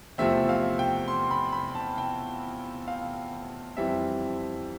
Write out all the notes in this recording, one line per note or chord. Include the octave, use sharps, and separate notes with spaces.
E2 C3 F3 A3 C4 E5
F5
G5
C6
B5
B5
A5
G5
F5
F2 E3 G3 C4 E5